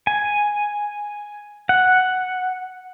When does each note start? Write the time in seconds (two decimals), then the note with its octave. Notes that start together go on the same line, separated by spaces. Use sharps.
0.07 G#5
1.69 F#5